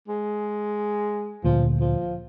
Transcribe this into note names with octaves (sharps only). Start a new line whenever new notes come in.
G#3
D2 A#2 F3
F3